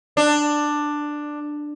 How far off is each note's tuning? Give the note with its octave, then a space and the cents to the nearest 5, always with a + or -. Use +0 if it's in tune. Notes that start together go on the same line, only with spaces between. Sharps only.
D4 +10